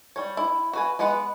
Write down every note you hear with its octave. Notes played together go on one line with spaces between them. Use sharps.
G3 C#5
E4
F#4 B4 G#5
G#3 B3 B4 F#5